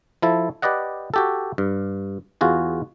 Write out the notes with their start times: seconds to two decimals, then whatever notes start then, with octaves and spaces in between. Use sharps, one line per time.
0.22 F3 E4 A4
0.62 G4 B4 D5 D#5 F#5
1.14 F#4 G4 A4
1.58 G2
2.41 E2 F4 F#4 G#4